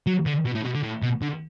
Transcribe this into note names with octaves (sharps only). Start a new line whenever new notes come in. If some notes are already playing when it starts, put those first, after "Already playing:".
F#3
D3
B2
A2
B2
D3
A2
B2
D3